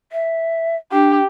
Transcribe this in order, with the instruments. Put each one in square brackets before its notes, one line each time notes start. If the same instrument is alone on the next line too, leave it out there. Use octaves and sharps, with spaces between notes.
[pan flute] E5
[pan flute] D4 [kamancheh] G4